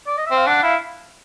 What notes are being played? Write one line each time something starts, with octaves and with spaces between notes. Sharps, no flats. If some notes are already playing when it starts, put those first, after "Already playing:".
D5
D#5
C4 E5
F5
D4 F#5
E4 F5